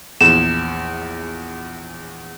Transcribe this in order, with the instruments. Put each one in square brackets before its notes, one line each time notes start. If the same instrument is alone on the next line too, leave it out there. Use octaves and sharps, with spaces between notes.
[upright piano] A#1 E2 [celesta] E7